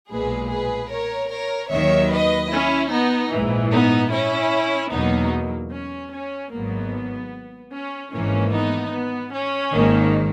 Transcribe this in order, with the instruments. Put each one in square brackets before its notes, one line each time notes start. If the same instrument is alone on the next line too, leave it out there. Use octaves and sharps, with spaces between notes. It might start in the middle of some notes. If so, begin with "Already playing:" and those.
[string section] B1 A#2 G#3 G#4 B4
G#4 B4
A#4 C#5
A#4 C#5
D#2 D#3 F#3 C#5 E5
B4 D#5
C#4 E4
B3 D#4
A#1 G#2 E3
B3 D#4
C#4 E4
E2 B2 F#3 A#3 B3 D#4
C#4
C#4
G#1 G#2 F#3 A#3 B3
C#4
G#1 G#2 E3 A#3 C#4
B3 D#4
B3
C#4
G#1 G#2 D#3 A#3